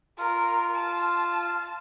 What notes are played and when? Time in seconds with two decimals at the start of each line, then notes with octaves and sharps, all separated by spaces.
0.18 F4 A#4
0.74 A5